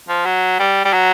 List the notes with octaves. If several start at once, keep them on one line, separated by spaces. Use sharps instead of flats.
F3
F#3
G3
G3
F#3